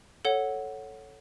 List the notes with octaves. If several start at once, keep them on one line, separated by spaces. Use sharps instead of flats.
A4 C#5 F#5